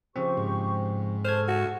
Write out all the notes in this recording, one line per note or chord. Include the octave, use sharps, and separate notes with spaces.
C#3 F3 C4 G4 C5 C#6
G#2
A4 C5 C#6 F6 G#6
F#4